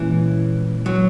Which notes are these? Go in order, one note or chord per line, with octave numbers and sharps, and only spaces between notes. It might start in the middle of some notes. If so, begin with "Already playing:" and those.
Already playing: A#2 E3 G#3 C#4 E4
F#3